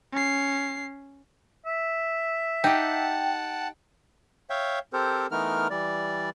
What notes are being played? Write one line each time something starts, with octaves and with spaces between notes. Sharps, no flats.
C#4 C7
E5
D#4 G4 F#5 G5 A5
C#5 E5 F5 G5
C4 G4 A4 A#4 C5
E3 A3 B3 D#4 A#4 F6
E3 G3 D5